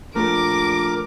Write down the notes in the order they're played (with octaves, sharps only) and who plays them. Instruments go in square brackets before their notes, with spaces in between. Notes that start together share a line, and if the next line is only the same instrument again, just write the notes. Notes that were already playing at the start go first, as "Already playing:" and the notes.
[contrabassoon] A#1 [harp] A3 [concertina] A#4 [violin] D6